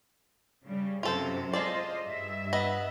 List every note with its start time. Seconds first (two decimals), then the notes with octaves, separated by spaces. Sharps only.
0.65 C#3 G3
1.03 F#2 C3 F4 A4 C5
1.53 G#3 F4 A4 C5 D5 D#5
2.07 G2 E5
2.53 B3 D#5